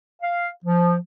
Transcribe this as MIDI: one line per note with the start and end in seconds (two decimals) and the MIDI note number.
0.22 0.48 77
0.64 0.96 53